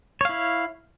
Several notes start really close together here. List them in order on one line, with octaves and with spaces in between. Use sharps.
C#5 F5 E4